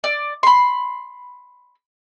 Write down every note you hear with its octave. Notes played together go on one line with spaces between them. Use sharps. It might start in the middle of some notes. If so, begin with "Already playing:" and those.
D5
B5 C6